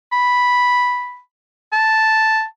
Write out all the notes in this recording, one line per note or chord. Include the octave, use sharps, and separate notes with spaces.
B5
A5